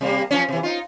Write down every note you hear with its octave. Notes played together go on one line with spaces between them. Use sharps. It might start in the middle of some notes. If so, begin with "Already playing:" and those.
C3 G3 A#3
F#2 F3 C#4
C3 E3
D#4 F4